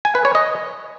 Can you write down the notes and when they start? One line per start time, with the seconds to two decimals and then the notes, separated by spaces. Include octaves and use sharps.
0.05 G#5
0.15 B4
0.25 C#5
0.35 D#5